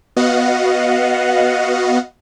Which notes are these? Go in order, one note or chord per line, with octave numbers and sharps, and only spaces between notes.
B3 F#4 D#5 F5 F#5